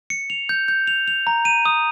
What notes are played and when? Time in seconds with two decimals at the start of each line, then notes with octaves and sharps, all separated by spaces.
0.10 C#7
0.30 F7
0.49 G6
0.68 G6
0.87 F7
1.08 F7
1.27 A#5
1.45 D#7
1.66 D#6